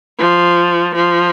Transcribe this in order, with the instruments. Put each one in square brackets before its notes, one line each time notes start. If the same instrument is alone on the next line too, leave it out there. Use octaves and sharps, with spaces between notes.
[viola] F3
F3